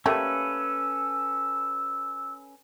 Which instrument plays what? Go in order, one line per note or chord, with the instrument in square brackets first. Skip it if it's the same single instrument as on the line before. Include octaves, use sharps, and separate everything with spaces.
[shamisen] G3 A3 A#3 [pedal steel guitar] C#4 A4 B4 [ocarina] E6